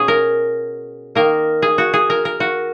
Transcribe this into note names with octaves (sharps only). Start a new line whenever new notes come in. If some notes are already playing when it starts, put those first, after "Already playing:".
Already playing: B2 C#4 G#4
A#4
D#3 A#3 A#4
G#4
F#4
G#4
A#4
A#4
F#4